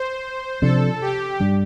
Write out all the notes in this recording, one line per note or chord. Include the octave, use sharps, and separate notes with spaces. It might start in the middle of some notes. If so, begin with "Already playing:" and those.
Already playing: C5
C3 F3 D4 A4
G4
G2 G3 D4